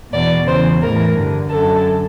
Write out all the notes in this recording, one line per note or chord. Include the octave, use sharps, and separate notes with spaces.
E2 B2 D5
E2 C#3 E3 C5
A2 E3 A#4
G2 D3
F#2 D3 A4